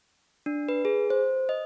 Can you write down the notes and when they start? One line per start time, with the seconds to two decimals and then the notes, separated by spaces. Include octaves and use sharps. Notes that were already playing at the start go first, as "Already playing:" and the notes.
0.46 D4
0.69 B4
0.85 G#4
1.10 C5
1.49 D#5